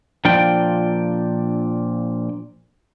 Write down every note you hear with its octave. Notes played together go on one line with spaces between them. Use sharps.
A#2 F3 D4 F4 D5 G5